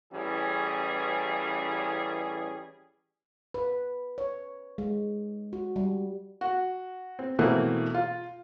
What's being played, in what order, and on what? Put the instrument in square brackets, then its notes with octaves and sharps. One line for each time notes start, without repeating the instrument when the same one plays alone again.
[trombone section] A1 E3 G3 C#4 G#4
[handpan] B4
C#5
G#3
F#4
G3
[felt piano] F#4
C4
B2 E3 A3 A#3 C4
F4